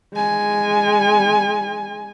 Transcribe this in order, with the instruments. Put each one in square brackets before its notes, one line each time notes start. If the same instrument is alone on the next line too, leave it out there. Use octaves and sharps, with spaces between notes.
[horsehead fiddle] G#3 G#5